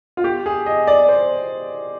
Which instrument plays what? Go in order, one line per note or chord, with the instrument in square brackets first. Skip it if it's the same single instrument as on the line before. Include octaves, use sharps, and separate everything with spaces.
[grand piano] F4
G4
G#4
D#5
D5
C5